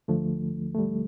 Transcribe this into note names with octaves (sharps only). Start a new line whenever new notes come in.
D2 D3 F3 A3
A3
G3